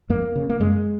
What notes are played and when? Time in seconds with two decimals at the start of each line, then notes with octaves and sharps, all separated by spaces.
0.10 F2 A#3
0.35 C#3
0.49 A#3
0.60 F#2 G#3